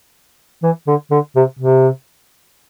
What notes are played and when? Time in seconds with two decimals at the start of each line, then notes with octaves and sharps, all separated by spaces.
0.63 E3
0.88 D3
1.11 D3
1.36 C3
1.59 C3